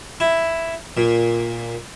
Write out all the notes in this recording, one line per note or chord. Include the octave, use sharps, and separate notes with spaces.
E4
A#2